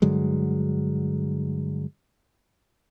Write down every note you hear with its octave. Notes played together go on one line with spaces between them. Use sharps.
G2 D3 F#3 G#3